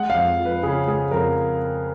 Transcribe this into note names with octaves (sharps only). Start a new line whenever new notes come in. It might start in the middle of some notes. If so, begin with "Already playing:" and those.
Already playing: G#3 F#5
F5
F2
F3
B4
C#3 G#4
G#3 G#4
F2 A#4